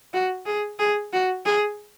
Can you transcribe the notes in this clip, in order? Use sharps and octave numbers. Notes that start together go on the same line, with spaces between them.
F#4
G#4
G#4
F#4
G#4